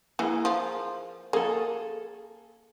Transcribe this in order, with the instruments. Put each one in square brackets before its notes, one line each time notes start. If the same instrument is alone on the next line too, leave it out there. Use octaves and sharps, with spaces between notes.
[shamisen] E3 [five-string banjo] A#3 G#4
[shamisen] F3
[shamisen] A#3 [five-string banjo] G#4 A4